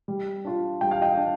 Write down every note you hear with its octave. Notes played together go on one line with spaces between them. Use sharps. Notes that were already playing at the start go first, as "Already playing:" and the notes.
G3
D4 F4
G3 G5
F5
D#5 G5
D4